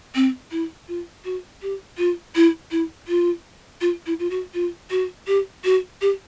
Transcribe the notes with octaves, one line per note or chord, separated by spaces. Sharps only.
C4
E4
F4
F#4
G4
F4
E4
E4
F4
F4
E4
F4
F#4
F4
F#4
G4
F#4
G4